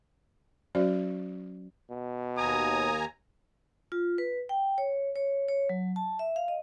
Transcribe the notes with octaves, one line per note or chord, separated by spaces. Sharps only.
F#3 C#4 F#4 C5 D5
B2
D#2 G#5 A#5 D#6
F4
B4
G5
C#5
C#5
C#5
F#3
A5
E5
F5
D#5